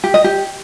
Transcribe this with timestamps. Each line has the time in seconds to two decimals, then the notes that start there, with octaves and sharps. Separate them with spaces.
0.04 G4
0.14 D#5
0.24 G4